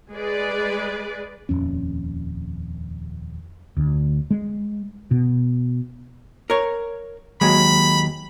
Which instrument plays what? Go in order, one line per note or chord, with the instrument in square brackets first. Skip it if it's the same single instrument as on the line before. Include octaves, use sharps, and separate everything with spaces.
[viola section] G#3 G#4 B4 D5
[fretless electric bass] D#1 G#1 F2 C#4
D2
G#3
B2
[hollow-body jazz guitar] A#4 C#5
[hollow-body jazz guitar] D#2 F#3 G#3 [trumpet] B5